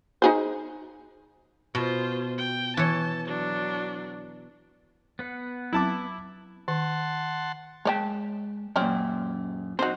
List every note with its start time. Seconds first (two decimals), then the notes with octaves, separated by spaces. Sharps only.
0.22 D#4 G#4 C5
1.75 B2 F4 C5
2.38 G5
2.77 E3 C#5 A5
3.27 F#3 D4
5.19 B3 B4 F#5
5.73 F#3 C4 E4 A5 D6
6.68 D#3 F#5 A5 C6
7.85 G#3 C#5 D5 G5 A5
8.76 F#2 A#2 C4 C#4 C#5
9.79 C4 D#4 F#4 C5